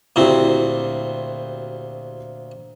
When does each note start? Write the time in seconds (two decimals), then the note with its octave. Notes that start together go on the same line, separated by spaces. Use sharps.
0.16 D2 A#2 C4 E4 F#4 G4